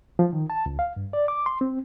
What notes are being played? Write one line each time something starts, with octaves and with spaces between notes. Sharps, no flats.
F3
D#3
A5
C#2
F5
G2
D5
D6
C6
C4